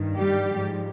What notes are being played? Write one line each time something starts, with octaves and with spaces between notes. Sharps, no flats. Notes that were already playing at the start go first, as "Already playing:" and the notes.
Already playing: G2 D#3
G3 G4
G#2 F3